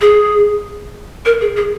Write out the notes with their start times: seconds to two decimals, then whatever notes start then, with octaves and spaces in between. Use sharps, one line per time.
0.01 G#4
1.25 A#4
1.41 G#4
1.57 G#4